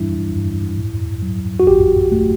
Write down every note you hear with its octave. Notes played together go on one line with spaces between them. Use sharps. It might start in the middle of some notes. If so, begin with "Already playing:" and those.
Already playing: G2 E3 G3 D4 E4
G2
A2
F#3
F#4
A1 G4
A3